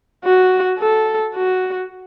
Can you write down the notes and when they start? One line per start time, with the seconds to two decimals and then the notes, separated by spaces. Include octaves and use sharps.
0.24 F#4
0.79 A4
1.35 F#4